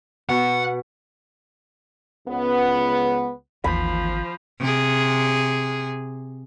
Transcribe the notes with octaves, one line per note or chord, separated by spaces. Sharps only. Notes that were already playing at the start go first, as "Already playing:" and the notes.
B2 F#5
C#2 B3
G#1 D#2 E3 F3 B5
C3 G#4